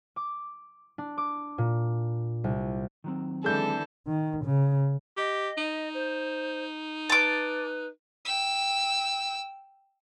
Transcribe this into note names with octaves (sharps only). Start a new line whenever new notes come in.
D6
D4
D6
A#2
C2
D#3 F#3 C4
D3 E3 G#3 A4 G6
D#3
C#3
G4 D#5
D#4
C5
B4 A5 D6
G5 E6